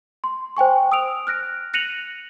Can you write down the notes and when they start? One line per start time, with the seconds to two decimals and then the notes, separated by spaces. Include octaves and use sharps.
0.24 C6
0.57 C5 G5 G#5 C#6
0.92 D#6 E6 D7 F7
1.27 F6 F#6 A#6 D7
1.74 F#6 A#6 C#7 D#7 F7 F#7